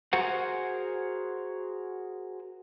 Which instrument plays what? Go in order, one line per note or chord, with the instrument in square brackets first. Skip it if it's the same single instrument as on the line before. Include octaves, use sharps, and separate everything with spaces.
[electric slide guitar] F#4 G#4 A#4 C5 F#5